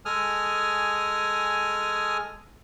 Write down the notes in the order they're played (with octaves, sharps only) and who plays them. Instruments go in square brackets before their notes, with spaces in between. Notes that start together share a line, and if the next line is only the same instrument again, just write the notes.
[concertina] G#3 A4 G#5 D#6 F6